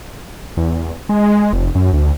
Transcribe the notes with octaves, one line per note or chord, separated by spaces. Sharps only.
E2
G#3
F1
F#2
D2